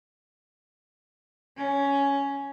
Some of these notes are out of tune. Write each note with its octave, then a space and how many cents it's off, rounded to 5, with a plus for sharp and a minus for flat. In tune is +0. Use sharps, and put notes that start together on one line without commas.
C#4 +10